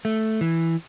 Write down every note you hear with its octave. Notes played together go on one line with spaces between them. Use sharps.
A3
E3